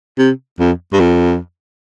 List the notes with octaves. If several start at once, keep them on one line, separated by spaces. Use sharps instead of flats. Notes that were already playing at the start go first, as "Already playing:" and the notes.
C3
F2
G2
F2